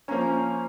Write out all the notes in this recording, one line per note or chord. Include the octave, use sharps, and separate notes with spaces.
F3 A#3 C#4 A#5
G#5